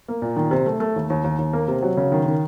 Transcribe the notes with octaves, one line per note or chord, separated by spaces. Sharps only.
A#3
A#2
D#3
C3
A3
A3
D#2
D#2
D#2
D#2
A#3
C3
F#3
C#3
D#3
D#3